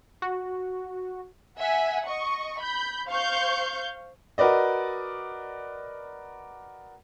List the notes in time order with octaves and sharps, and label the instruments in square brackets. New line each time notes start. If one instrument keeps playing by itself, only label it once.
[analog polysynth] F#4
[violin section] E5 F#5 G#5
D#5 C#6
B5 G6
C5 F5 C#6 G6
[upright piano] F#4 A#4 B4 D5 D#5